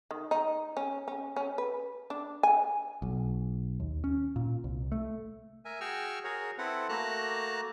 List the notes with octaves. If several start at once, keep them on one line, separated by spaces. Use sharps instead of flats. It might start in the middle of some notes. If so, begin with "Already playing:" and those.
D#3
D#4
C#4
C#4
C#4
B4
D4
G#5
B1
D#2
C#4
A#2
C2
A3
A#4 E5 G#5
F#4 G#4 G5 C#6 E6 F6
F#4 G#4 A#4 C#5
C4 E4 A4 B4 F#5
A3 A#3 F#4 A5 A#5 F#6